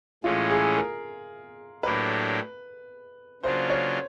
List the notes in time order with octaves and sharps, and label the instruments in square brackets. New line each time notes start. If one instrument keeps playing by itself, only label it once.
[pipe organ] A2 E3 G#3 C#4 [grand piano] F4
[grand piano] G#4
A#4
[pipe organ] A2 F#3 A#3 D4 G4 [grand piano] B4
[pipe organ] C#3 F#3 A#3 D4 F4 [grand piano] C5
[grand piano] C#5